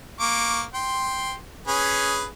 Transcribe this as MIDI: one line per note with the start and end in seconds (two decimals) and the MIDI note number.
0.20 0.63 58
0.20 0.63 85
0.20 0.63 86
0.74 1.34 79
0.74 1.34 84
1.68 2.26 61
1.68 2.26 68
1.68 2.26 71